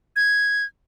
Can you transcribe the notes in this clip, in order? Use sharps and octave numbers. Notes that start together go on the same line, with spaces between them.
G#6